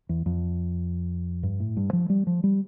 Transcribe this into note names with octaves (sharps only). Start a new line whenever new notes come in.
E2
F2
G2
A2
G2
F3
G3
F3
G3